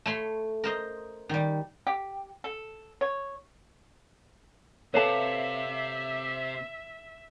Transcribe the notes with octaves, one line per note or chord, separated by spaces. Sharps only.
A3 C#5 B5 C6
A#4 C5 D#5
D#3 G3
G4
A4
C#5
C3 A4 B4 C#5 E5 F5 A5